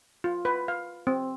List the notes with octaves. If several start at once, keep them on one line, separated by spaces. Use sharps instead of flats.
F4
B4
F5
C4